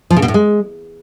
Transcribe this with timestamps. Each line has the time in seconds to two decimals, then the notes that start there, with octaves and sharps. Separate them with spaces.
0.10 F3
0.16 C#3
0.22 B2
0.28 A2
0.34 G#3